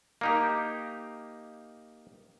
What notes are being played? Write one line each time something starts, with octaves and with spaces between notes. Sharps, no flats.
A#3 D#4 G4